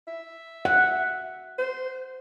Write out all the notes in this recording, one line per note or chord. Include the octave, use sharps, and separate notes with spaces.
E5
F#5
C5